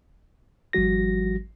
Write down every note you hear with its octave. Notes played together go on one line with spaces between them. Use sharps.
G#1 F3 G3 F#4 A#6